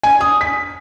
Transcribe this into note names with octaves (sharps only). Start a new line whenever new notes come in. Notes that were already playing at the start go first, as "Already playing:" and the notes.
G#5
D#6
B6